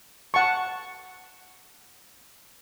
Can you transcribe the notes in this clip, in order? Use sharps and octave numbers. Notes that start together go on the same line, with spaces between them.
F#5 A5 C#6